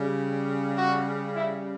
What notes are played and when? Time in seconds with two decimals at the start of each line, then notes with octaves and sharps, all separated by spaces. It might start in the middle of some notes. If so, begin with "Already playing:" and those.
Already playing: C#3 G3
0.77 F#4
1.35 E4